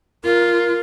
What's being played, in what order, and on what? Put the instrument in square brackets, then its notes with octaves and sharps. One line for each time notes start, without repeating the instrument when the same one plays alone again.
[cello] F4 [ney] A#4